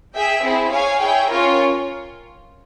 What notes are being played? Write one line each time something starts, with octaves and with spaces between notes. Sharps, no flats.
G#4 E5 G5
C4 E4 G#4
G#4 C#5 F5 G#5
E4 G#4 C#5 G5
C#4 F4 A#4 C#5